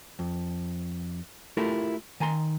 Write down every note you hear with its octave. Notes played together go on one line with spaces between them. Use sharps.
F2
A3 E4 F4 G4 A4 A#4
D#3 G#5 A#5 C6